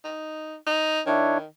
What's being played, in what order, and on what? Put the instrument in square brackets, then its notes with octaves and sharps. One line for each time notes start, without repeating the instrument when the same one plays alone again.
[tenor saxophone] D#4
D#4
[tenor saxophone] D#3 [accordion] D4 E4 C#5